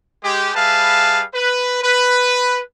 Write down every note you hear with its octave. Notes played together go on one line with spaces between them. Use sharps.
G#3 G4
G3 G#4 B4 E5 F5 A5
B4
B4